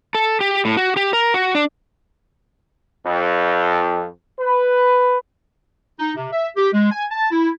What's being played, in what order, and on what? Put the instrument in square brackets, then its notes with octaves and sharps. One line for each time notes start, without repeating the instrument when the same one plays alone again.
[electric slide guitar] A4
G4
A2
F#4
G4
A#4
F#4
D4
[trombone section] F2
B4
[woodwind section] D#4
C3
E5
G4
G#3
G#5
A5
E4